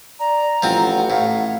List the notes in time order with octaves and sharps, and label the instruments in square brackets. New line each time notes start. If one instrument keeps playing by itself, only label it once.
[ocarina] D5 [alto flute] A#5
[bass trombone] A1 [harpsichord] F3 C4 [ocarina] F#5
[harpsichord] A2 [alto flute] F5